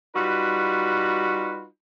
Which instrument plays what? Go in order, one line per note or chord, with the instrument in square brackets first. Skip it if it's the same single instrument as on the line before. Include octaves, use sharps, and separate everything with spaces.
[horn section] G3 D#4 F4 F#4 B4